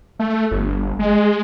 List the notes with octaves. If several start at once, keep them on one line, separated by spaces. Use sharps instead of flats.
A3
G1
G#3